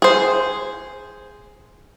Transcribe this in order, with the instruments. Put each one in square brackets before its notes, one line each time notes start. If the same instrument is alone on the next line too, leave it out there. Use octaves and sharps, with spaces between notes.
[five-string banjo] G#4 C5